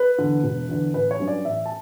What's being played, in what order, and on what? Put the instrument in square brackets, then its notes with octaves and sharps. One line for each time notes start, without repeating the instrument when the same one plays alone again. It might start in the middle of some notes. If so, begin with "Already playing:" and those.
Already playing: [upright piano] B4
E2 D3
E1
E2 D3
A1 B4
C#5
G2 F#3 C#4
D5
A1 E5
A5